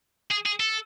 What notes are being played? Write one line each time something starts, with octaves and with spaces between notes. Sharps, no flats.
G#4
G#4
A4